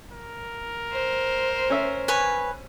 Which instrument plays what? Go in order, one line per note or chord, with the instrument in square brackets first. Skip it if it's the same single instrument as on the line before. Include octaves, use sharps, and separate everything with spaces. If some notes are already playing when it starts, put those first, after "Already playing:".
[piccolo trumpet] A#4
[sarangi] C5
[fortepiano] C#4 E5
[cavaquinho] B4 C#5 G#5